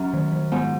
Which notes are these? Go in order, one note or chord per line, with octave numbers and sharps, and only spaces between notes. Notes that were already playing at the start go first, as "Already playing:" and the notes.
Already playing: F#2 C#4
D#3
D#3
G#2 B3